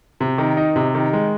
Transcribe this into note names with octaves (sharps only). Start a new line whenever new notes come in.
C3
D#3
D#4
C3
D#3
G#3